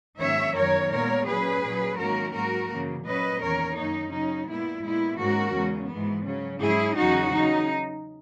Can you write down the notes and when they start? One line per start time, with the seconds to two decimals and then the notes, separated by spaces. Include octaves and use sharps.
0.20 G#2 D#3 F#3 A#3 C#4 C#5 E5
0.56 F#2 D#3 F#3 B3 A#4 C#5
0.91 A#2 G#3 B3 A#4 C#5
1.26 A#2 F#3 C#4 G#4 B4
1.63 A#2 F#3 C#4
1.98 G#2 D#3 F#3 A#3 C#4 F#4 A#4
2.33 G#2 F#3 A#3 F#4 A#4
2.69 F#2 C#3 E3 A#3
3.05 A#2 F#3 A#3 C#4 B4 D#5
3.40 E2 D#3 A#3 C#4 A#4 C#5
3.76 F#2 D#3 A#3 C#4 D#4
4.11 C#3 F#3 C#4 D#4
4.48 A#2 G#3 B3 E4
4.83 A#2 G#3 B3 E4
5.18 G#2 D#3 A#3 C#4 F#4 A#4
5.54 E2 C#3 G#3 C#4
5.90 G#2 E3 G#3 B3
6.26 C#3 F#3 C#4
6.61 G#2 F#3 C#4 E4 G#4
6.97 E2 C#3 F#3 C#4 D#4 F#4
7.32 C#3 F#3 C#4 D#4